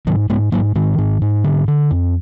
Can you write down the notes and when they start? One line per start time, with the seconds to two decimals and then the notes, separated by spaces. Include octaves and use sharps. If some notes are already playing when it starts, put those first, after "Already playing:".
0.07 G#2 D#3 F#3
0.29 G#2 G#3 B3
0.52 G#2 F#3 A#3
0.75 G#2 D#3
0.98 G#2
1.22 G#2
1.44 D3
1.68 D3
1.91 F2